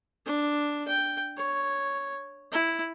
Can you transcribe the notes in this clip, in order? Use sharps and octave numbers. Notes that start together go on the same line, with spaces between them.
D4
G5
C#5
E4